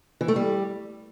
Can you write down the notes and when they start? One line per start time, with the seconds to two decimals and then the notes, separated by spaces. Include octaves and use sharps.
0.21 E3
0.28 A3
0.36 G3